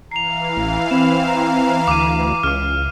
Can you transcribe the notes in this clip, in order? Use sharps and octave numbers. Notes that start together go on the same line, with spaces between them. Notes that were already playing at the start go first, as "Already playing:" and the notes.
E3 F5 A#5 C7 F7
A1
C4 B5 E7
A#5
D2 D6 D#7
C#2 D6 F6